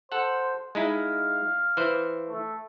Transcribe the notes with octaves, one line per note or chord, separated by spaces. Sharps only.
A4 C5 F#5
G#3 D#4 E4 F5
E3 C5
A3